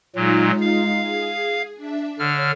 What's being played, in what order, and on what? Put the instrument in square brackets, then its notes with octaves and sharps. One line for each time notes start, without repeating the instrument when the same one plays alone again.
[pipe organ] A#2 F#3 [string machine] G#3 D#4 F4
[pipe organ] F5
[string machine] G#4
D4 E5
[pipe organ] D3 F6 [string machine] C#5